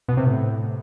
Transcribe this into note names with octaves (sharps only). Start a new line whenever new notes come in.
B2
C3
A2